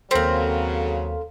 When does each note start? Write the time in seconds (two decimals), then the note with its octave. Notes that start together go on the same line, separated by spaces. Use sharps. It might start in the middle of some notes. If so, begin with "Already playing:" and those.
0.11 D#2 C#3 F#3 C4 A4 A#4 F5 B6